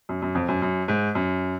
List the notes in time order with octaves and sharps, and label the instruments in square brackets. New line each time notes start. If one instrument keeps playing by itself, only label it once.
[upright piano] F#2
F#2
F2
F#2
F#2
G#2
F#2